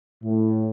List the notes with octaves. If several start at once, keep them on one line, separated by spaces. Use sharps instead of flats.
A2